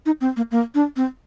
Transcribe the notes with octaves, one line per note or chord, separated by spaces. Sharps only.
D#4
C4
A#3
A#3
D4
C4